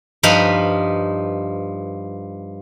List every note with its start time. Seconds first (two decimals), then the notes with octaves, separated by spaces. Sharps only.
0.23 G2 F3 D#4 B4 F5